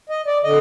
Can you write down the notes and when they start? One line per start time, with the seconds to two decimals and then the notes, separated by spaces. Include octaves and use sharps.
0.10 D#5
0.27 D5
0.44 D3 D#5